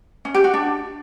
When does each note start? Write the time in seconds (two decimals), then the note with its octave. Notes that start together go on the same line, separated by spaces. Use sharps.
0.25 C#4
0.34 G4
0.44 F#4
0.54 D4